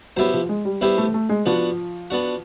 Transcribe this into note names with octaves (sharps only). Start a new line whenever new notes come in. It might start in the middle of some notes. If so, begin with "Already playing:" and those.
F#3 B3 E4 G4 C5
F3
G#3
G3
G3 B3 E4 G4 C5
A3
A3
G#3
F3 B3 D4 F#4
B3 D4 F#4